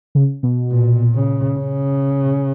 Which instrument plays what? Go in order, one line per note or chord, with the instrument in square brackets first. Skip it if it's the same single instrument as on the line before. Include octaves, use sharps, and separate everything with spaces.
[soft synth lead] C#3
B2
[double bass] A#2
C#3
C#3